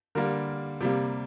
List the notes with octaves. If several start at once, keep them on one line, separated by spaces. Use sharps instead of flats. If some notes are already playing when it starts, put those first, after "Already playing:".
D3 G3 A#3 A#4
C3 G3 A#3